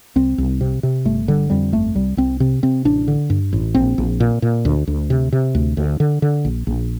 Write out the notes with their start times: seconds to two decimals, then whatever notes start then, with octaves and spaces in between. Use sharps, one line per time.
0.16 C2 C4
0.38 C2
0.61 C3
0.83 C3
1.05 G1 A3
1.28 D3 G3
1.50 F2 G3
1.72 G1 A3
1.95 C2 G3
2.17 C2 C4
2.40 C3 C4
2.63 C3 C4
2.85 A1 D4
3.08 D3
3.30 G2
3.53 A1
3.75 A#1 C4
3.98 A#1
4.20 A#2
4.42 A#2
4.65 D2
4.87 D2
5.10 C3
5.32 C3
5.55 D2
5.77 D2
6.00 D3
6.22 D3
6.45 A#1
6.67 A#1